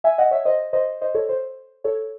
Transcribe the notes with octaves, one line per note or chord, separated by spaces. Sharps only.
E5 G#5
D#5 F#5
C#5 E5
C5 D#5
C5 D#5
C5 D#5
A4 C#5
C5
A4 C#5